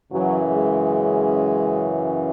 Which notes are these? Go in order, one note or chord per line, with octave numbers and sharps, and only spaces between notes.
F#2 C#3 E3 F#3
G#3